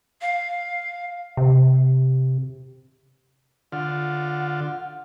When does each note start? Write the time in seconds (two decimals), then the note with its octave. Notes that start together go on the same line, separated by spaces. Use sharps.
0.21 F5
1.37 C3
3.72 D3 F4 F#5